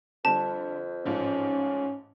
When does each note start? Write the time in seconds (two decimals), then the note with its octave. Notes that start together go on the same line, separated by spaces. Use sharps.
0.25 F2 D3 G3 A5
1.06 A1 G#2 F3 C#4